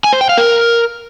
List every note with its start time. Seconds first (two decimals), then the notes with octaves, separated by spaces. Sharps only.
0.04 G#5
0.13 C5
0.21 G5
0.29 F5
0.38 A#4